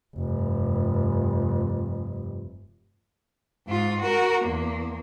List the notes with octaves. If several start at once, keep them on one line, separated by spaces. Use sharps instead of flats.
F1 G2
G#2 F4
F#4 A#4
E2 A#3